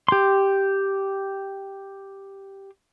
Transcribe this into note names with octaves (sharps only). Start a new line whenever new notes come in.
G4 C6